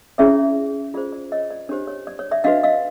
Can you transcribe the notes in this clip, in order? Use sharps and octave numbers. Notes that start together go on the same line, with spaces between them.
C#4 E4 G#4 C#5 D5 E5
F4 G#4 C5 D5
D5
C#5 D#5
D5
D4 G4 C5 C#5
C#5
D5
C#5
D5 E5
D4 F#4 B4 D#5 F5
D#5 F5